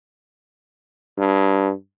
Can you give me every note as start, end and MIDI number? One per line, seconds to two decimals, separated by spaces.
1.18 1.72 43